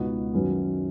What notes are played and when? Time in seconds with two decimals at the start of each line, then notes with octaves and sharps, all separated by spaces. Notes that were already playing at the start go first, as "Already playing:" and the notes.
Already playing: C#2 B2 B3 D#4 F#4
0.34 F#2 D#3 F#3 C#4 B4